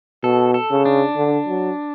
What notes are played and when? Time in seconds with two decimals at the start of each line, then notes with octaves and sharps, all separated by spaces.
0.23 B2 A4
0.54 A4
0.70 C#3
0.86 D4
1.17 D3
1.48 F#3